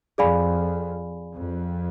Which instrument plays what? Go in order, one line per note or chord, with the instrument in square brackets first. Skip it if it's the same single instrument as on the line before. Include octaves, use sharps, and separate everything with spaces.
[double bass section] F2 [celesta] G#4 D5 F5 G#5 B5
[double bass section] F2